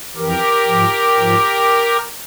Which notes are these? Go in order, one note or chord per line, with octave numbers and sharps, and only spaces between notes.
F2 E3 G4 A#4
G#2 F3
G#2 F3